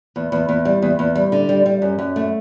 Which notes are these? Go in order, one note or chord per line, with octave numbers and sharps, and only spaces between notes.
E2
E2
E2
G3
E2
E2
G3
D3
G3
G3
F#2
F#2
A3